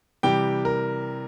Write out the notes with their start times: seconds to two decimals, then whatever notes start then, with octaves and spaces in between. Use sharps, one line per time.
0.23 C3 E3 G3 G4 G5
0.65 A#4